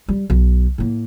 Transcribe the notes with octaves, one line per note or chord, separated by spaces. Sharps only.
G3
B1
A2 A#3